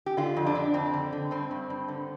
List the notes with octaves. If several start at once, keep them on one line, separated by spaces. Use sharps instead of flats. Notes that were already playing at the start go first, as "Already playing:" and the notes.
G4
D3 F4
F2
D4
D3
F2 C4
D3
D3
G2 C4
G2
G2
D3